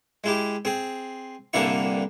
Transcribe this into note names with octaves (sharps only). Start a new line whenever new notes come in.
G#3 E4 G4
C4 G#4
C2 G2 D3 A#3 E4 C#6